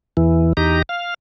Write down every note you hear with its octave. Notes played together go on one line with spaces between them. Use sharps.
E2 E3
E2 D#4 G4 A#5
F5